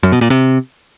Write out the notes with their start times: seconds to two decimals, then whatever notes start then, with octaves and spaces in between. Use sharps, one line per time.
0.03 F#2
0.12 B2
0.21 A#2
0.30 C3